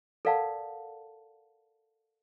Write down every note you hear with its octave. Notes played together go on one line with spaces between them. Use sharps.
A4 A#4 D5 F5 F#5 A5